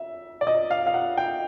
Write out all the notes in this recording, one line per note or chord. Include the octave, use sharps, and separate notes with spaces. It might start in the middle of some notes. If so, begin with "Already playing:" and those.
Already playing: E5
D5
D#5
F5
F5
F#5
G5